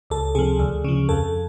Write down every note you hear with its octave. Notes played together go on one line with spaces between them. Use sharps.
C#2 A4
C3 F3 G#4
D2
C#3 F3
F2 A4